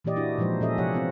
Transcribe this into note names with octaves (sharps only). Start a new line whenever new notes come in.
A#2 E3 A#3 G4 D5 D#5
D4 E4 F#4
A#2 F3 G#3 D#4 C5
A#2 C#4 A4 D#5 E5
C3 F3 G4 C#5 F#5
B3 C4 F4